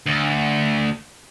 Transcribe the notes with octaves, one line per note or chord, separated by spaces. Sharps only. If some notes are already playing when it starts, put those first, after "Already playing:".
D2